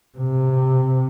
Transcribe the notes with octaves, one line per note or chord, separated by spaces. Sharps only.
C3